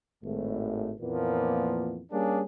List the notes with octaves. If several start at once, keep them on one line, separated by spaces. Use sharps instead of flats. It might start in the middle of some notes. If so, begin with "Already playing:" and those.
G#1 A2 A3
F2 A#2 E3 F3 A#3 B3
G3 A#3 C#4 D4 G4 G#4